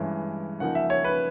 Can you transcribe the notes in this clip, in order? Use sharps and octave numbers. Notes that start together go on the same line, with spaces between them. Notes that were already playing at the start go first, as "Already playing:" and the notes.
Already playing: G2 E3 G#3 C#4 E4
C#3 F3 A#3 D#4 F#5
E5
C#5
B4